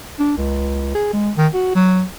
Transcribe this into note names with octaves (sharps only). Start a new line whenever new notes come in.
D4
C#2
G#4
G#3
D#3
F#4
F#3